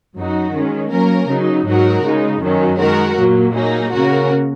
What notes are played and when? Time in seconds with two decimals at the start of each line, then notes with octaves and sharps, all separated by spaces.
0.17 F#2 F#3 D#4 F#4
0.53 D#3 G#3 C#4
0.91 F#3 A#3 C#4 A#4
1.29 C#3 F#3 D#4
1.67 G#2 F#3 D#4 F#4 A#4
2.04 C#3 G#3 D#4
2.42 F#2 D#3 F#3 C#4
2.79 D#3 G#3 F#4 A#4
3.17 A#2 F#3 A#3
3.54 F#3 A#3 D#4 G#4
3.92 C#3 A#3 C#4 F#4 A#4